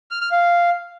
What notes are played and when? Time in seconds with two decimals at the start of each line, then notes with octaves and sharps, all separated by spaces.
0.11 F6
0.21 F6
0.31 F5